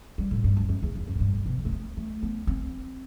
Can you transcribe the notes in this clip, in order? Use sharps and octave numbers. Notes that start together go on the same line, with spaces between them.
G3
A2
G2
F#2
F#2
E2
E2
F#2
A2
G2
A2
B2
F#3
A3
B3
A3
B3
C4